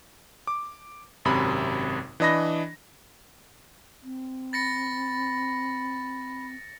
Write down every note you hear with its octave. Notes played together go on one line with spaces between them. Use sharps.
D6
G#1 F#2 C3 B5
E3 D4 D#5 B5 A#6
C4
B5 A6 A#6 C#7